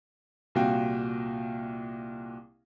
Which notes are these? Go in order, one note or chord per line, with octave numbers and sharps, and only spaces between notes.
C2 A#2 F#4 F5 G5